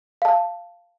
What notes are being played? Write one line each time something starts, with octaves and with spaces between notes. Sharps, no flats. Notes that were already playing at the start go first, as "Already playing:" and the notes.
F5 A5